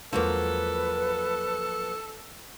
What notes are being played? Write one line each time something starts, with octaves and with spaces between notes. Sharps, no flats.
E2 F3 F#3 G#3 A#3 D4 A4 B4